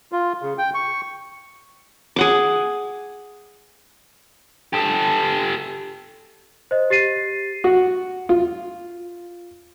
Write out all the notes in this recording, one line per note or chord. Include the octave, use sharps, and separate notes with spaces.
F4
C#3
G5
C#6
G#4 F#5 D6
G4 A4
C5 D#5
G4 A6 C7 D#7
F#4
F4